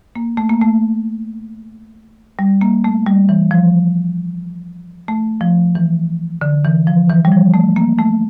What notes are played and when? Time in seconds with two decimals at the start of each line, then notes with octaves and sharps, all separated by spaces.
0.16 A#3
0.37 A3
0.49 A#3
0.61 A3
2.39 G3
2.61 A#3
2.84 A3
3.06 G3
3.29 E3
3.51 F3
5.08 A3
5.41 F3
5.75 E3
6.41 D3
6.65 E3
6.87 F3
7.10 E3
7.25 G3
7.32 F3
7.54 A3
7.76 A#3
7.98 A3